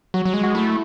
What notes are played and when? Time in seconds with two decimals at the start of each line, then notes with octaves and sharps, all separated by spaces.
0.14 F#3 F#4
0.25 F#3
0.34 G#3
0.44 F#4
0.55 A3 E4